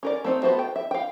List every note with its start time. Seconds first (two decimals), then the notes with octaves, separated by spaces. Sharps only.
0.03 C#4 A#4 D5
0.24 A3 C4 D#4
0.43 B3 F#4 A4 C5 E5
0.59 G5
0.76 E5
0.91 F5 G5